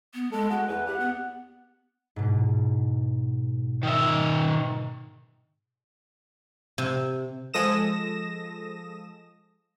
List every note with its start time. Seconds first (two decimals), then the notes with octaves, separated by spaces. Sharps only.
0.14 B3
0.32 G#3 A4
0.50 G#3 F#4 G#4 F#5
0.68 E2 B4
0.86 G4 F#5
1.00 B3
2.16 G#2 B2
3.83 D#3 E5
6.78 C3
7.54 F3 G#3 A4 D#6 A#6 E7